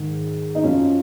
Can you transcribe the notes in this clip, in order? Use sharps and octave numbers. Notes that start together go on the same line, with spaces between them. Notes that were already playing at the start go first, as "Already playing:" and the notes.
Already playing: G#2 D#3
D#4
F#2 F3 C#4